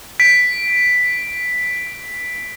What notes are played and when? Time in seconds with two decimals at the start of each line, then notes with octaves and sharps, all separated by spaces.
0.20 B6 D7